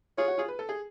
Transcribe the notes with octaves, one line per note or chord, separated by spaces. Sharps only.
F4 G#4 C#5
F#4
F4 G#4
B4
A4
G#4